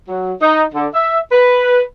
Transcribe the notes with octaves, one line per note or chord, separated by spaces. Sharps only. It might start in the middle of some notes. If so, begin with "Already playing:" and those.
F#3
D#4
D3
E5
B4